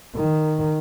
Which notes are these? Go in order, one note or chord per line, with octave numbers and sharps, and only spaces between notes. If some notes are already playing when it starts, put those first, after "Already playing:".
D#3